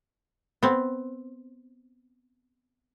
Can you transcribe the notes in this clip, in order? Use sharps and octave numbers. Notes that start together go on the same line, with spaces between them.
B3 C4